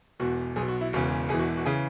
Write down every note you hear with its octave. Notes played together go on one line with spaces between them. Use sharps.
E1 E2 B2 F#4
B1 G#4
B2
F#4
E4
E1 E2 C#3 F#4
E1 E2 E3 G#4
F#4
F#4
C#3 E3 G#4